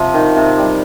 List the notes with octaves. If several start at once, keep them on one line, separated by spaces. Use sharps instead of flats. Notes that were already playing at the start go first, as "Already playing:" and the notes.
Already playing: C3 F3
D#3
C3
G3